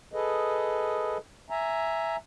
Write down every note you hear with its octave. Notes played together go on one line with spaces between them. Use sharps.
G#4 A4 B4 D#5
E5 G#5 A#5